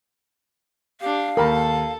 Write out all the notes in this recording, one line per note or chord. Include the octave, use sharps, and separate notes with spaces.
D4 G4 F5
D#2 A4 A#4 G5 A5 B5